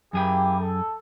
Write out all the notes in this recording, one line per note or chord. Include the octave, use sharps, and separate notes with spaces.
F#2 A#3 E4 G4 G#4 G5
A4